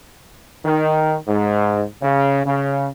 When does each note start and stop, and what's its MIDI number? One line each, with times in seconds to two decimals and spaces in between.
0.66 1.17 51
1.27 1.84 44
2.03 2.41 49
2.46 2.87 49